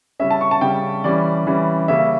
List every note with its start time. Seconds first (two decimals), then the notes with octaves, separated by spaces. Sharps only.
0.20 C#3 G3 C#4 E5
0.31 A5
0.41 C#6
0.51 A5
0.61 C#3 G3 C#4 G5
1.04 E3 G3 C#4 D5
1.47 E3 G3 C#4
1.88 C#3 G3 A#3 C#4 E5